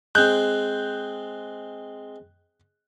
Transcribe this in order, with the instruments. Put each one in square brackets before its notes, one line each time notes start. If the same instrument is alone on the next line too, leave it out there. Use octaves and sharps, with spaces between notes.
[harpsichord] G#3 C4 [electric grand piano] F#6 G6